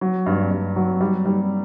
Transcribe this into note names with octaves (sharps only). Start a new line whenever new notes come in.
F#3
G2
G2
F#3
G3
G3